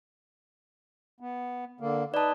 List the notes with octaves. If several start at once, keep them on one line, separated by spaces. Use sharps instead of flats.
B3
D3 A#3
D#4 B4 D5 A5